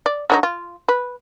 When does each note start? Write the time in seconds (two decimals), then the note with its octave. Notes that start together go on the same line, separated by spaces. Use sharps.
0.06 D5
0.30 D3 F#3 D#4
0.43 F4
0.88 B4